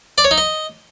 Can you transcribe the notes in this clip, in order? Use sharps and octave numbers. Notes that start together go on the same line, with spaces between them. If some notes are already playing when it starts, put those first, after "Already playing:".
D5
C#5
D#4
D#5